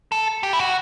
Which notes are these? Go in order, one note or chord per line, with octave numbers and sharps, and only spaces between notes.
A4
G4
E4
F#4